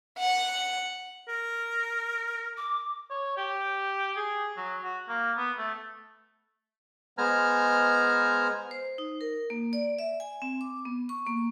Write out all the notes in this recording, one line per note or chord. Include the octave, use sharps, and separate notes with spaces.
F#5
A#4
D6
C#5
G4
G#4
F#3
F#4
A#3
B3
A3
G#3 B3 C5 G#5 A#5 F6
C5
D#4
A#4
A#3
D5
E5
G#5
C4
D6
B3
C#6
A#3